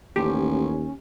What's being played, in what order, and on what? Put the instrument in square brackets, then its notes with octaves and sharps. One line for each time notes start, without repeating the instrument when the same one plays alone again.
[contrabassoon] A1 [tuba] D#2 [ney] C#4 [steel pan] G4